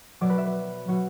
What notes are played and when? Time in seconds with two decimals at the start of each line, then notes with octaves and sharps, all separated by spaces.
0.21 B2 F#3 D5
0.30 B4
0.38 E5
0.46 B4
0.88 B2 F#3 F#4